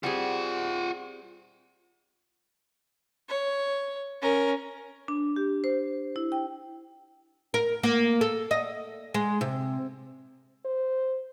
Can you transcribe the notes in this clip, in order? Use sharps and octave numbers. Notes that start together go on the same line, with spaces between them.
G3 C4 F4 G#4 F#5
C#5
C#4 A#4
D4
G4
C5
E4
G5
A#4
A#3
A4
D#5
G#3
C3
C5